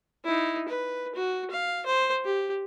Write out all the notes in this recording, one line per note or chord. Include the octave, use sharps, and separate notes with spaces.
D#4 E4
B4
F#4
F5
C5
G4